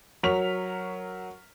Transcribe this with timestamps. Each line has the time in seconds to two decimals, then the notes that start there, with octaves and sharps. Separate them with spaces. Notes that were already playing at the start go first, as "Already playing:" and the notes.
0.23 F#3 A#4 C#6 F6 B6 F7